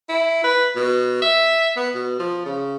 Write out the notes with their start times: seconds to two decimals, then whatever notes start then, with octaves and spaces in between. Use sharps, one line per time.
0.09 E4
0.44 B4
0.76 B2
1.22 E5
1.77 B3
1.95 B2
2.19 F3
2.46 C#3